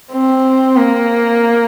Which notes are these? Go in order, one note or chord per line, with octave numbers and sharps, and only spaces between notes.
C4
A#3